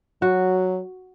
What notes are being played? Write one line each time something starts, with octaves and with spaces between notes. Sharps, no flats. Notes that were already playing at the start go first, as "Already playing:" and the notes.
F#3 F#4